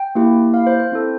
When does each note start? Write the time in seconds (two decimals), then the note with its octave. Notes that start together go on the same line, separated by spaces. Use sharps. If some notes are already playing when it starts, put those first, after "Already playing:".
Already playing: G5
0.15 A#3 E4 G4
0.54 F5
0.67 C5
0.79 C5
0.92 C4 E4 A4